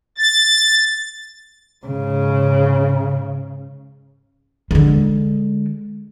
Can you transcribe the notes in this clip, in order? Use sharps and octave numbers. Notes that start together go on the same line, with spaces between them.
A6
G#2 C#3
D3 G#3